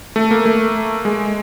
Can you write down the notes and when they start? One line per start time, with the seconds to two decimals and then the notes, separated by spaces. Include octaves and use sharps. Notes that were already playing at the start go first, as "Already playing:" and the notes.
0.16 A3
0.31 A#3
0.46 A3
1.05 G#3